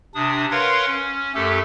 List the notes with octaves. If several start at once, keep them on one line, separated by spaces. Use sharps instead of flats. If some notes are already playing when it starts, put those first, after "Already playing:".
C3 D4 D#6
A#4 B4 C#5 F5 F#5 C6
C#4
F#2 A3 G4 A4